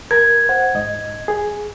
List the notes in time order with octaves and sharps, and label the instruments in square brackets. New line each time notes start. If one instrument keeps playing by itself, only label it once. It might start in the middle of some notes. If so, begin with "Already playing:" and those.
[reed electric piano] A#4 A#5 [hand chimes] G#6
[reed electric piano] C5 F#5
G#2 D#5
G#4